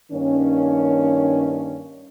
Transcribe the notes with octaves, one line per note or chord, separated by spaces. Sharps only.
G2 D#3 A#3 C#4